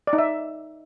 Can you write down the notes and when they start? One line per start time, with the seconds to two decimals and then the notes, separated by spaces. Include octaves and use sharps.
0.07 D5
0.13 D#4
0.18 E5